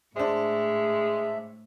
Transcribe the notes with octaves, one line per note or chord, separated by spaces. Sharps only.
A2 G#3 D4 C5 E5